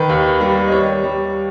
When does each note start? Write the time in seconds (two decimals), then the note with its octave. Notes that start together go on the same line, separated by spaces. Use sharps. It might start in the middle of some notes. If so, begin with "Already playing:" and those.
Already playing: D#3 B4
0.09 D#2
0.41 G3
0.68 D#5
0.72 G3 C#5
1.04 G3